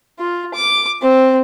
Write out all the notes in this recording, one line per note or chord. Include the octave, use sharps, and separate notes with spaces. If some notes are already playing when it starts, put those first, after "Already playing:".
F4
D6
C4